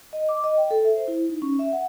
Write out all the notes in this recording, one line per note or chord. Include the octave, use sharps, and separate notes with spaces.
D#5
D6
D#5
G5
A4
E5
C5
E4
D#4
C#4
E5
F#5